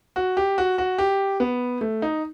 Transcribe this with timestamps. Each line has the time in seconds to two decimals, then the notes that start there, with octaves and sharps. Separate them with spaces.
0.16 F#4
0.37 G4
0.58 F#4
0.78 F#4
0.98 G4
1.40 B3
1.81 A3
2.02 D#4